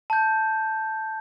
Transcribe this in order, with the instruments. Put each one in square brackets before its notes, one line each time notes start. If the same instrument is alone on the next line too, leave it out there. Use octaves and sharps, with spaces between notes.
[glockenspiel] A5 G6